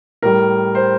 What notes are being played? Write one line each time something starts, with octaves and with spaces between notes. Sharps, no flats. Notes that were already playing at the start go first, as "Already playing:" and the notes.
A2 G3 A#4
C5